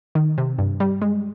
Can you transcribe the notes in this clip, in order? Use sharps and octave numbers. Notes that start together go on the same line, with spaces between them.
D#3
C3
G2
G3
G#3